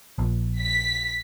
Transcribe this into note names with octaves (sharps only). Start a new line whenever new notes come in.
A#1
B6